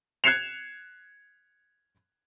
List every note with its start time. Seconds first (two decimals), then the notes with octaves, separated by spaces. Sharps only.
0.24 F#6 G#6 C7 C#7 E7 F7